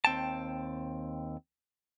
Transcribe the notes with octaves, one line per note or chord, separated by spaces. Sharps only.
D#2 C4 G5 A5